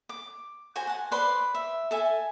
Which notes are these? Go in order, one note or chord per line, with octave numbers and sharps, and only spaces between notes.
D6
F#4 C5 G#5
F#5 A5
B4 C5 D5 C6
E5
A4 E5 G#5